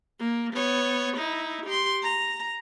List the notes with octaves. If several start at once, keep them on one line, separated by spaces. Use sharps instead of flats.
A#3
B3 C#5
D#4 E4
G4 C6
A#5